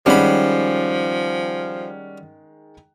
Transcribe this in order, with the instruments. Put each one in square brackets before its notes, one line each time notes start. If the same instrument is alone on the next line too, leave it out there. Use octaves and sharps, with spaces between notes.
[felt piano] D#3 G#3 [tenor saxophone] F3 [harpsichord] G3 B5 [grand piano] C#4 F#5